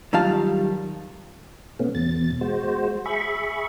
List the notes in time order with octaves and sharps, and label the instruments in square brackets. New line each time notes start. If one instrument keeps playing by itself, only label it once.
[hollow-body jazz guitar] D#3 F#3 G3 F4 F5 A5
[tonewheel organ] B2 A3 B3 C#4
E2 B2 A6
G#3 F#4 C5
G#4 E5 B5 C#6